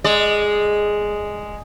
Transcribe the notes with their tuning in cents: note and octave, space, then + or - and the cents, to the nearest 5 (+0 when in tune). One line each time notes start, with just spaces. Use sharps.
G#3 +0 D5 +25